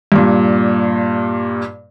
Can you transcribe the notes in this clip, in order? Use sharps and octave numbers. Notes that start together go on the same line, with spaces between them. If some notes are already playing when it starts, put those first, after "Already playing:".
G2 A#2